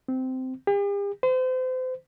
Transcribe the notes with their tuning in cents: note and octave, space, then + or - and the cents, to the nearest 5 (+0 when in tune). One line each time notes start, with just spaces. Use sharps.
C4 -15
G4 +45
C5 -35